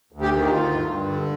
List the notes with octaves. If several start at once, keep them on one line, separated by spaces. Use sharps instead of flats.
D2
G4
D#3
D#4
D3 F4
G2
G2
D3